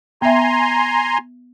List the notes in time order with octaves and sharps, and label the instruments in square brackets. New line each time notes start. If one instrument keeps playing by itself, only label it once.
[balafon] B3 E5 [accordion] G#5 A#5 C6